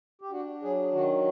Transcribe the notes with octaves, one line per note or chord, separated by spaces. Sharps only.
G4
D4 F#4
F#3 G#4
D#3 F#4